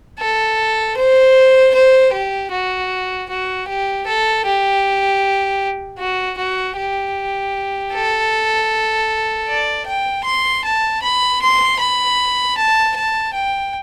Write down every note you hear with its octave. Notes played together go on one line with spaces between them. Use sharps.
A4
C5
C5
G4
F#4
F#4
G4
A4
G4
F#4
F#4
G4
A4
D5
G5
C6
A5
B5
C6
B5
A5
A5
G5